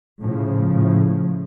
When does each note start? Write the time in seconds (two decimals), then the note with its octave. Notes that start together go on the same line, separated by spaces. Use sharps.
0.21 A2 C#3 F3
0.71 A2